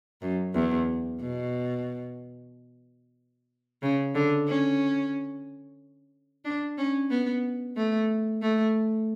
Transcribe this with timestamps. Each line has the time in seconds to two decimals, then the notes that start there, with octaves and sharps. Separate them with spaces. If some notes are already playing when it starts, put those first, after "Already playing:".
0.22 F#2
0.54 E2
1.20 B2
3.82 C#3
4.15 D3
4.48 C#4
6.45 D4
6.78 C#4
7.10 B3
7.76 A3
8.42 A3